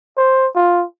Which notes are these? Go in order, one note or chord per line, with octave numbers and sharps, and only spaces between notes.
C5
F4